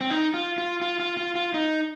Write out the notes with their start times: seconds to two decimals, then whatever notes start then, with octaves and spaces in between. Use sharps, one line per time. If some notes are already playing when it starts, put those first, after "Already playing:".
0.01 C4
0.10 D#4
0.34 F4
0.58 F4
0.82 F4
1.00 F4
1.17 F4
1.35 F4
1.54 D#4